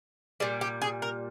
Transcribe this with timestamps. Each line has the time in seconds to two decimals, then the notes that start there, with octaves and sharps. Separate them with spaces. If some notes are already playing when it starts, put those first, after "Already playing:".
0.40 A#2 G3 G#4
0.61 G4
0.82 G#4
1.02 A#4